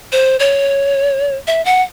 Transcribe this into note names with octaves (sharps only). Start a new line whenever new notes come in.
C5
C#5
E5
F#5